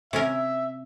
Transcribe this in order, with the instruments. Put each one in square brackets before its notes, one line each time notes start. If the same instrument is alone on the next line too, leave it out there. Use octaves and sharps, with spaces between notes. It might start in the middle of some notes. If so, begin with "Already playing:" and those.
[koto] C3 C#4 A#4 [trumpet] E5